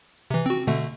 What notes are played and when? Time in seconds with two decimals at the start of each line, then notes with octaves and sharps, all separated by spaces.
0.31 C3 E3
0.46 C4 F#4
0.67 B2 D3 A3